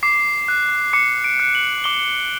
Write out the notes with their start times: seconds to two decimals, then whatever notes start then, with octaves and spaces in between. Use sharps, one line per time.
0.03 D6 C7
0.48 F#6
0.93 D6 C#7
1.24 D7
1.40 F#6
1.55 F#7
1.84 D6 G7